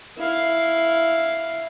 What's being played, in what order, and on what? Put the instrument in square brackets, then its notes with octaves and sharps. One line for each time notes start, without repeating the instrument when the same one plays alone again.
[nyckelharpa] E4 F5